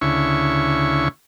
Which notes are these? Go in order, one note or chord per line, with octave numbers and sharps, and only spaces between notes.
D2 C#3 E4 C#6